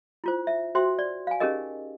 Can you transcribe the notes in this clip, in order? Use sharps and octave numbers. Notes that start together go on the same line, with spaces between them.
E4 F4 C5
E5
F#4 C5 E5 G5 C6
D5
F5 G#5
C#4 D#4 G4 G#4 A#4 D#5